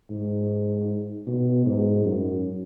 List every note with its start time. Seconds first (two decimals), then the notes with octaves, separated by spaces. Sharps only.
0.10 G#2
1.27 B2
1.66 G#2
2.04 F#2